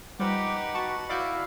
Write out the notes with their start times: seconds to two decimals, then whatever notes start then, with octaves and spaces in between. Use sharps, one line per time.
0.19 F3 G3 D#4 G4 B4 F#5 D6
0.74 F#4 A5 C#6
1.09 E4 F#4 D5 F5 D6 G6